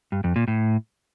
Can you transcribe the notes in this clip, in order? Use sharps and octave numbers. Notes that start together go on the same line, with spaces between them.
G2
F2
A#2
A2